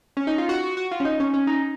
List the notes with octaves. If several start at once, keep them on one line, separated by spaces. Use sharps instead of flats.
C#4
D#4
F4
F#4
F#4
F#4
F4
C#4
D#4
C#4
C#4
D#4